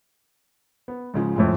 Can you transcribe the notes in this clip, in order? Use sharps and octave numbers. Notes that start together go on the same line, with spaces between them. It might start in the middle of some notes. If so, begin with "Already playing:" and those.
B3
G#2 C#3 F3
F2 A2 G#3